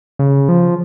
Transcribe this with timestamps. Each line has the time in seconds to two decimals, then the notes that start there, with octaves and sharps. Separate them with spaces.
0.19 C#3
0.49 F3